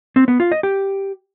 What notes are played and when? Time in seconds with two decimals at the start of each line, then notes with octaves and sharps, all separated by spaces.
0.16 C4
0.28 B3
0.40 F4
0.52 D#5
0.63 G4